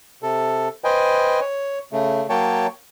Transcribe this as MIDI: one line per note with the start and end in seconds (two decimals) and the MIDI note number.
0.23 0.68 48
0.23 0.68 69
0.84 1.40 71
0.84 1.40 72
0.84 1.40 75
0.84 1.40 79
0.84 1.40 80
1.41 1.79 73
1.92 2.27 49
1.92 2.27 57
2.30 2.67 54
2.30 2.67 58
2.30 2.67 73
2.30 2.67 79
2.30 2.67 81